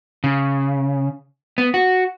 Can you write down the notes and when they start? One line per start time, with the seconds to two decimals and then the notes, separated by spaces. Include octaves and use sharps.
0.24 C#3
1.58 B3
1.74 F#4